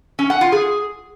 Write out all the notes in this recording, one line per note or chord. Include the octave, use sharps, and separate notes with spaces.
C#4
F#5
F4
G#4